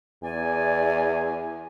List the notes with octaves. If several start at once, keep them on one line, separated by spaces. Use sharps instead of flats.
E2 D5 G#5